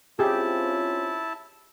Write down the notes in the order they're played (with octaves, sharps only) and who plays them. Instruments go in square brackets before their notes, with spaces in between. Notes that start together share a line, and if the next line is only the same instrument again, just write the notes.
[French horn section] C4 C#4 F4 [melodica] E4 A5 [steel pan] G4 G#4